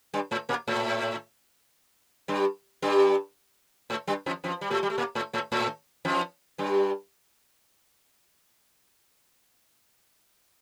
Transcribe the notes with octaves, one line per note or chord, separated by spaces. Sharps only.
G2 G3
A2 A3
A#2 A#3
A2 A3
G2 G3
G2 G3
A2 A3
G2 G3
F2 F3
F2 F3
G3
A2 A3
G3
A3
A#2 A#3
A2 A3
A2 A3
A2 A3
F2 F3
G2 G3